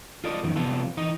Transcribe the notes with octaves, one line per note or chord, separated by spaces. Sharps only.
F4 A4 D5 D#5
F#2 D#3 E3
C3 F3 G3 B3 F4 A4
E3 D#4 D#5